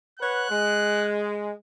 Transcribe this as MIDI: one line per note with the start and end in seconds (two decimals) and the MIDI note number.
0.20 0.48 71
0.20 0.48 73
0.20 0.48 78
0.20 1.11 90
0.50 1.51 56